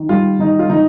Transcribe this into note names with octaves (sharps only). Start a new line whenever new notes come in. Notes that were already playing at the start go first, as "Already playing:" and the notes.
Already playing: D#3
G3 F4
D#3 D#4
F4
D#3 D#4